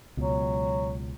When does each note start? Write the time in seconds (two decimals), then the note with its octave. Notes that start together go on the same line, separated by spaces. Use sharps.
0.17 C#2 B2 F#3